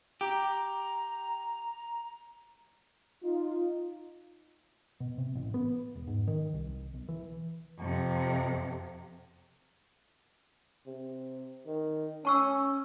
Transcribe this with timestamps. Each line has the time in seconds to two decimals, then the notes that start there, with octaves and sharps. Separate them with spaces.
0.21 G4 A#5
3.23 D#4 F4
5.00 B2
5.18 C3
5.35 A1
5.54 B3
5.95 E1
6.07 G#2
6.28 D#3
6.53 C2
6.94 B1
7.09 E3
7.79 F2 C3
10.86 C3
11.66 D#3
12.25 C#4 A5 C#6 E6